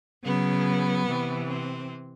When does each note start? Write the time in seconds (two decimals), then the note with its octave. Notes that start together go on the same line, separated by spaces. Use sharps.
0.23 C#3 F#3 B3
1.05 C3 E3
1.46 C4